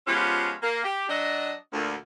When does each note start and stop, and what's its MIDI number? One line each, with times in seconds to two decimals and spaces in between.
0.07 0.53 53
0.07 0.53 56
0.07 0.53 59
0.07 0.53 61
0.07 0.53 65
0.07 0.53 67
0.62 0.80 58
0.84 1.07 67
1.09 1.53 54
1.09 1.53 62
1.09 1.53 75
1.73 1.94 38
1.73 1.94 46